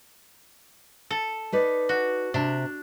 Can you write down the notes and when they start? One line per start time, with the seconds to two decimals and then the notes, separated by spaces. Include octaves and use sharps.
1.11 A4
1.52 D#4 B4 D5
1.89 F#4
2.34 C3 D4